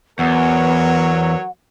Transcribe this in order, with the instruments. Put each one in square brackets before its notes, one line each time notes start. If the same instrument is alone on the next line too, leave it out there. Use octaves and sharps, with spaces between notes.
[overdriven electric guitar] E2 [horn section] F#3 A#4 C#5 [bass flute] B3 [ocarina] F#5